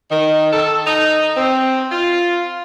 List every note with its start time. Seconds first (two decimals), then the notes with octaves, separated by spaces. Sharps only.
0.10 D#3
0.53 A4
0.87 D#4
1.36 C4
1.92 F4